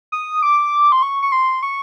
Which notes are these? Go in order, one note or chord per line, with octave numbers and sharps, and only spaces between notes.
D#6
D6
C6
C#6
C#6
C6
C#6